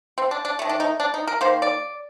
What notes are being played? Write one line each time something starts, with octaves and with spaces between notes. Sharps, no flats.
C4
D4
D4
D#3 A3
D4
D#4
D4
D#4
A#4
D#3 A#3 C5
D5